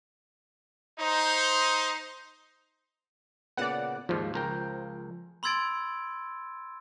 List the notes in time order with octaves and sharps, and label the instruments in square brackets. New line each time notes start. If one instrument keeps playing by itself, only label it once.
[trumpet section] D#4 C5
[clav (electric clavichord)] A#2 C#3 B3 [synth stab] D5 F#5
[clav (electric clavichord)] D#2 G#2 [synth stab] F3
[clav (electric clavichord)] C#2 A#4 G5
[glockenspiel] B5 C6 E6 G#6 A6 D7